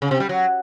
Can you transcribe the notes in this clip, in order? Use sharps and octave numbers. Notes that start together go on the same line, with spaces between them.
C#3
C3
G3
F#3